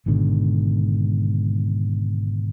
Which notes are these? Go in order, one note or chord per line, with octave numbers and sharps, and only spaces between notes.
G#1 G#2 B2 D3